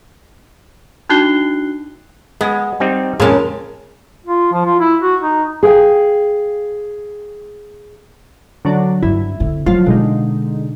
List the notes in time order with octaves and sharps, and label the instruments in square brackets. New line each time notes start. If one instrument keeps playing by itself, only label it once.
[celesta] D4 D#4 F#4 F#6 C7 G7
[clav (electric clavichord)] G#3 [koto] B3
[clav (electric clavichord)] G3 C4 D#4
[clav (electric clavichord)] F2 A#2 F5 [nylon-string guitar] C#3 C#4 A#4 [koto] G#3 A5
[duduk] F4
F3
F4
E4
F#4
D#4
[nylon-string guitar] G#4 F5 G5
[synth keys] D3 F#3 D4
[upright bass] G2 [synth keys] E4
[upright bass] D3 C4
[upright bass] F3 F#3 [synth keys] F4
[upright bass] B2 [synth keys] D3 G#3 D#4